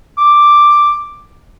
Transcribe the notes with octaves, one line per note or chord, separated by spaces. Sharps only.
D6